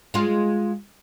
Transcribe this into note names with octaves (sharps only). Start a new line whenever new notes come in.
G#3 F4